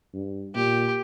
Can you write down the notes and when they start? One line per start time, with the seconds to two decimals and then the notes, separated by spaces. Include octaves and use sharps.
0.14 G2
0.55 A#2 G4